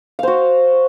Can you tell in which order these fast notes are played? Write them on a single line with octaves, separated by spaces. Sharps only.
F5 C5 F#4